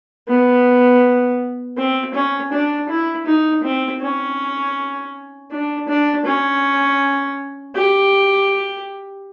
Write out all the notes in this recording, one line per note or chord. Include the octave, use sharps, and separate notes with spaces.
B3
C4
C#4
D4
E4
D#4
C4
C#4
D4
D4
C#4
G4